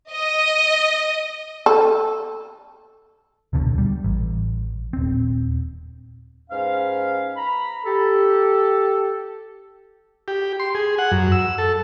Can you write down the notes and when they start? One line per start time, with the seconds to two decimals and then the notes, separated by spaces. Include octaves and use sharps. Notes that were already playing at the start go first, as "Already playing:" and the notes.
0.10 D#5
1.66 A4
3.53 D#1 C#2 B2 D3
3.78 G3
4.04 A1
4.93 D#1 C4
6.50 G#2 C#4 B4 F5
7.37 A#5 B5
7.84 G4 A4
10.28 G4
10.60 C6
10.75 G#4
10.98 F#5
11.12 F#2
11.32 E6
11.58 A4